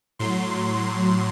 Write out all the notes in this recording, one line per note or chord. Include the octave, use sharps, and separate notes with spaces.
A2 F#3 C6
C6